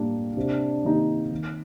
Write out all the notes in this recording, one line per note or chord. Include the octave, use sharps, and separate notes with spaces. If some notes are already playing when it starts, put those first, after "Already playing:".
Already playing: A2 G3 A#3 D4 G4
C3 D4
D#3 A#3 D#4 G4
D#3